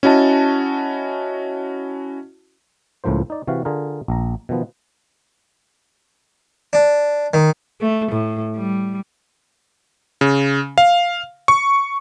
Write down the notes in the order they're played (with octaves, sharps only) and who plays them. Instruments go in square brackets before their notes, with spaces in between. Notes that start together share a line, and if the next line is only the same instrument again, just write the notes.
[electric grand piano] C#4 E4 F#4 D#5 A5
[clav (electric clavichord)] C#2 A2 F3 A#3 C5
D#4 D5
C3 E3 F#4 F5
D3 F4 G#4 A#4
A#1 A#5
B2 D#3 F3 B3
[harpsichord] D4
D#3
[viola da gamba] A3
A2
G3
[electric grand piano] C#3
F5
C#6